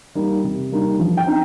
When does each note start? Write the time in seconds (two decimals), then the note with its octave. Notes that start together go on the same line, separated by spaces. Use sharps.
0.15 G3 A#3 D#4
0.44 C3
0.72 G3 A#3 D#4
0.99 F3
1.17 G5
1.27 C4 D#4